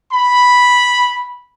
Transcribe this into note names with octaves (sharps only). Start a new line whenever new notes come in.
B5